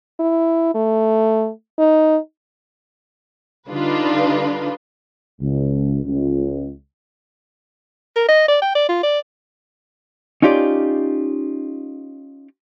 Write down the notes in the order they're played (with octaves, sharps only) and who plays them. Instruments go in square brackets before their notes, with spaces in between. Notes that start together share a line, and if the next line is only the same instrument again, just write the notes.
[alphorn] E4
A3
D#4
[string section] D3 G3 D4 D#4 F4 B4
[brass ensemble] C#2
C#2
[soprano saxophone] A#4
D#5
D5
G5
D5
F4
D5
[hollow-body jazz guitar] C#4 D#4 F4 G4 D5